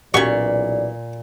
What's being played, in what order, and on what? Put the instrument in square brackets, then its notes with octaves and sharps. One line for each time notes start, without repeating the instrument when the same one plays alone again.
[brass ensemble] B1 E3 D5 [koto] A#2 [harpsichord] F#3 G3 [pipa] C#4 C#6